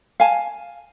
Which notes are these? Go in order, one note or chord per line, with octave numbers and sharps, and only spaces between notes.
F5 G#5 A5